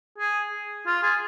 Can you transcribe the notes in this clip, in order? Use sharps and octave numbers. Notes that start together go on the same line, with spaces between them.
G#4
F4
G#4